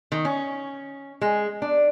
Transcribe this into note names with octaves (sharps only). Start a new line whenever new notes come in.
D#3
C#4
G#3
D4